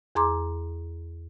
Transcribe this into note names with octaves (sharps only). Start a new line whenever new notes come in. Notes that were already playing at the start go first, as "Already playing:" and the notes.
E2 G#4 A#5 C6 D6